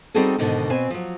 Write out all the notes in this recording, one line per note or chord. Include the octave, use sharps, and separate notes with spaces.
G3 C4 D#4 F#4 G#4 A4
G#2 B2 D3 D#3
B2 C4 G#5
F3 F#3